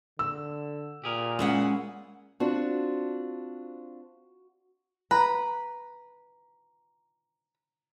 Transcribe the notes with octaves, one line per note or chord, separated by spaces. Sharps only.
D3 E6
A#2 G4 G#4 A#4
G#3 C#4 E4 F4 G#4 F#5
C4 D4 F4 F#4
B4 A#5